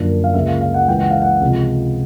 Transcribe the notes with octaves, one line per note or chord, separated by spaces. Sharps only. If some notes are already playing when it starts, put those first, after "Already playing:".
Already playing: F#2 D3 F3 A#3 D4
F5
C#2 C#3 F3 A#3 E5
F5
F5
F#5
C#2 C#3 E3 G#3 G5
F#5
F5
F#5
C#2 C3 F3